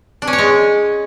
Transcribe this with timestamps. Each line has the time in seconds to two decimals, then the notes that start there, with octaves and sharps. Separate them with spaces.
0.22 D4
0.27 C#4
0.33 C#5
0.38 G#3